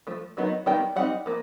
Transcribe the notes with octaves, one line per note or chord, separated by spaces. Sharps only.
F3 A3
D#3 F#3 B3 D#4
D#3 G3 B3 D#4 G5
G3 C4 D#4 F#5
F3 A#3